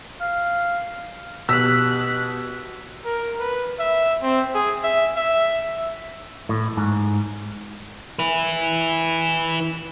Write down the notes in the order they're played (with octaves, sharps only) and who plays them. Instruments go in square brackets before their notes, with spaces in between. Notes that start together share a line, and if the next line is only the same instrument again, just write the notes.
[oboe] F5
[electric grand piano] B2 [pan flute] G4 [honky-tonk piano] E6 [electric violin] F#6 B6
[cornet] A#4
B4
E5
C4
G#4
E5
E5
[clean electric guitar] A2
G#2
[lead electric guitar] E4 B4